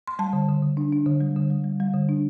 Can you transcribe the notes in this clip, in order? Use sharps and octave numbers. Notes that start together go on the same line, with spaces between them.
C6
G3 A5
D3
D3
D3
D4
D4
D3
G3
D3
G3
G3
G3
D3
D4